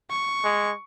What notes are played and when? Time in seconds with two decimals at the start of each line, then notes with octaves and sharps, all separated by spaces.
0.10 C#6
0.44 G#3